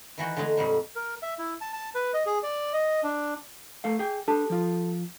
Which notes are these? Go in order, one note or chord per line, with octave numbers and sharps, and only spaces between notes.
D#3 E3 F#4 G5
D3 G#3 A3 D#4 G#4
F2 A#2 G3
A#4
E5
E4
A5
A5
B4
D#5
G#4
D5
D#5
D4
A3 A4 F5
G#4 G5
D4 G4 A4 A5
F3 F4